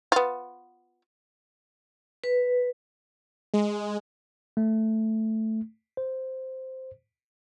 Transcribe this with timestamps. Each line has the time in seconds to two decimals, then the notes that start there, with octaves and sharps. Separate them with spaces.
0.12 B3 F4
2.24 B4
3.54 G#3
4.57 A3
5.97 C5